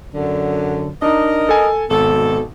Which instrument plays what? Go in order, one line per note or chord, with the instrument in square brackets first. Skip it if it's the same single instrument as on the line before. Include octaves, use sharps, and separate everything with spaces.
[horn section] F#2 D3
[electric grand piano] D4 D#4 [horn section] A#4 D#5
[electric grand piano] A4 G#5
[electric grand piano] G#1 [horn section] B2 A4